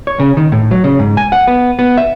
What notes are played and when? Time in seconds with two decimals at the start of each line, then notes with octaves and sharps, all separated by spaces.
0.07 C#5
0.20 C#3
0.37 D#3
0.52 A2
0.71 F#3
0.84 C#3
0.99 G#2
1.17 G#5
1.32 F#5
1.47 B3
1.79 B3
1.97 E5